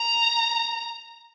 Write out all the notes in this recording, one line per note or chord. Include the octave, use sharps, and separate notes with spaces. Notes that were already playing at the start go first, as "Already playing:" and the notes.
Already playing: A#5